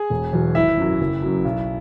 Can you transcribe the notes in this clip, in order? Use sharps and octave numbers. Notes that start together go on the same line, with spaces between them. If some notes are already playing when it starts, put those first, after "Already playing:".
Already playing: G#4 G#5
E1
E2 B2 F#3
G#1 E4 E5
F#2 F#3
F#1
F#2 F#3
B1